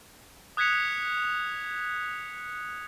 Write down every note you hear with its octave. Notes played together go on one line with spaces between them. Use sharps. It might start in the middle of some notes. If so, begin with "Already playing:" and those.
D#6 F#6 G#6 B6 C#7 F7